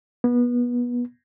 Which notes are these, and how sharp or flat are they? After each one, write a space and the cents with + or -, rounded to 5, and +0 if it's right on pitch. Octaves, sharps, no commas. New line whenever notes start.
B3 -25